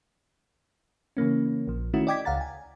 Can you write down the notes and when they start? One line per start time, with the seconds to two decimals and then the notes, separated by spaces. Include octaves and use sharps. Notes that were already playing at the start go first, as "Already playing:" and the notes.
1.17 C#3 E3 A#3 C#4
1.68 A#1 F3
1.93 D#3 A3 C#4 E4 F#4
2.07 D5 D#5 G5 D6 G#6 B6
2.25 C#2 F5 F#5 A#5 A6
2.41 G#5